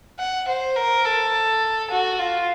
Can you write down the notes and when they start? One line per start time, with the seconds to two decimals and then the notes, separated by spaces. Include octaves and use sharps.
0.19 F#5
0.48 C5
0.76 A#4
1.04 A4
1.90 F#4
2.19 F4